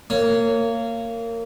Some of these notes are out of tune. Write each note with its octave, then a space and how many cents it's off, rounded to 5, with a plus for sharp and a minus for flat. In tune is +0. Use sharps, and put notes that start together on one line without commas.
A#3 -25 C#5 +0